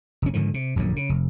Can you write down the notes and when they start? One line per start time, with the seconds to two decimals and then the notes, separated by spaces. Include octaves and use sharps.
0.22 F1 C#4
0.33 G#2 D3 D#3 F3
0.54 C3
0.76 D#1 A#1 F#2 F#3
0.96 C#3
1.09 F1